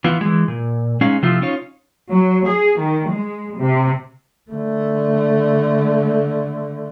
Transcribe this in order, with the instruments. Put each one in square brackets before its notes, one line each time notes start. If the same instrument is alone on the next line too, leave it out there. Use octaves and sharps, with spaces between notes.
[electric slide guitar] E3 B3 F4
E3 G#3
A#2
G#3 C#4 D#4 G#4 F5
C3 F3 A3 E4 F4
C#4 D#4 F4 C#5
[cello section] F#3
G#4
D#3
G#3
C3
[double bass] D3 A3